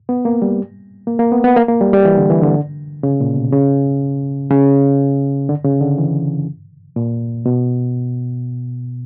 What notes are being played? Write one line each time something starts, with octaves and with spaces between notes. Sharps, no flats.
B3
A#3
G3
A#3
A#3
B3
B3
A#3
A#3
G3
G3
E3
D3
E3
D3
C#3
A#2
B2
C#3
C#3
D3
C#3
D3
E3
A#2
B2